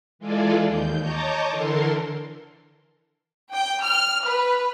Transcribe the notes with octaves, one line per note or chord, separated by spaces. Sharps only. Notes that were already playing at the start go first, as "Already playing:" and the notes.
E3 G#3 F4 G#4 A4 D5
D#2 G6
C#5 D#5 A5 A#5 D6 G6
D3 E3 A4 A#4 C6
G5
F6
B4